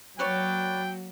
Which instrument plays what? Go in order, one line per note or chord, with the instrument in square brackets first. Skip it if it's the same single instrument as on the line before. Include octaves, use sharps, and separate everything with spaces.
[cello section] F#3 A#3 F#4 [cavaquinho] B4 C#5 D5 [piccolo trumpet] G5